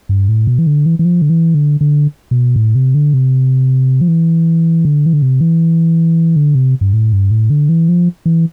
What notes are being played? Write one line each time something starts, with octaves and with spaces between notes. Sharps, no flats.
G2
A2
B2
E3
D3
E3
E3
F3
D3
E3
D3
D3
B2
A2
C3
D3
C3
F3
E3
D3
E3
D3
C3
E3
D3
C3
G2
A2
G2
A2
D3
E3
F3
E3